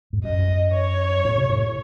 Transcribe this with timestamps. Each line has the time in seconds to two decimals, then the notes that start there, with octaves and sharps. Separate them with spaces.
0.13 G#2
0.24 F#2 D#5
0.74 C#5
1.25 A2
1.38 C3
1.49 A2